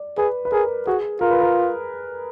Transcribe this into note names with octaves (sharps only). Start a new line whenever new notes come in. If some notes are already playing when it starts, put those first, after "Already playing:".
Already playing: D5
G#4 B4
B4
G#4 A#4
F#4 G#4
F4 A#4
B4
A#4